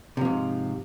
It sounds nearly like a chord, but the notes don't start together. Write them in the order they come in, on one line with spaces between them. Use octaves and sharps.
C3 F3 G#2